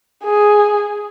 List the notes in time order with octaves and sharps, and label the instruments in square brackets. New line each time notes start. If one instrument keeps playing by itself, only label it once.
[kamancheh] G#4